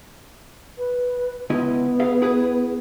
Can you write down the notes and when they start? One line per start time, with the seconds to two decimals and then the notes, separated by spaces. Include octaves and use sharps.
0.78 B4
1.50 C#2 B3 E4 D#5
2.00 G#4 E5 F5
2.22 E4 G#4 B4